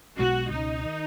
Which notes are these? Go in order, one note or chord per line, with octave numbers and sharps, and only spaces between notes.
B1 B2 G#3 C#4 F#4
C#2 B2 A3 C#4 D#4
D#3